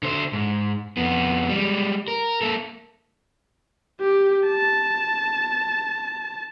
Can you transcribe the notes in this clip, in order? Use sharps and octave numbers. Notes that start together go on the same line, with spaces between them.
D3 C5
G#2
F2 B3
G3 G#3
A#4
A#3 A4
G4
A5